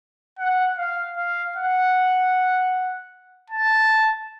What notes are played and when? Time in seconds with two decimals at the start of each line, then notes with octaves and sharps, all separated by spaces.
0.39 F#5
0.78 F5
1.16 F5
1.56 F#5
3.50 A5